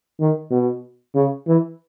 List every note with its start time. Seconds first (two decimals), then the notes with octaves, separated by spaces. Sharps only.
0.20 D#3
0.51 B2
1.15 C#3
1.47 E3